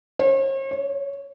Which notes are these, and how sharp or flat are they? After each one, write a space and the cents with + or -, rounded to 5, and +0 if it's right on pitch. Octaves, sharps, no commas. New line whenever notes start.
C#5 -45
C#5 +10